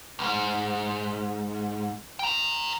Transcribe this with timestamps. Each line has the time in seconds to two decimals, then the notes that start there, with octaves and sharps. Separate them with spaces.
0.19 C#2 G#2
2.19 G5 A#5